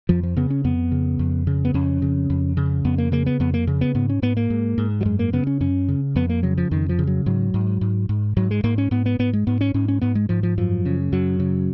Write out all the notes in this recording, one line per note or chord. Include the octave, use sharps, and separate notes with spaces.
F2 F3
F3
C#3 B3
C#4
F2 B3
C#3
F2
C#3
B3
F2 C#4
C#3
F2
C#3
F2 B3
A#3
C#3 A#3
B3
F2 B3
A#3
C#3
B3
G#2 B3
C#4
G#2 B3
A#3
G#2
G#2
F#3
F#2 G#3
A#3
C#3 B3
C#4
F#2 C#4
C#3
F2 B3
A#3
C#3 F#3
F3
F2 D#3
F3
C#3
F#3
G#2 F#3
G#2
G#2
G#2
G#2 F#3
G#3
G#2 A#3
C#4
G#2 B3
B3
G#2 B3
G#3
G#2 B3
C#4
G#2 C#4
C#4
G#2 B3
G#3
G#2 F3
F3
F#2 F3
C#3
F#2 F#3
C#3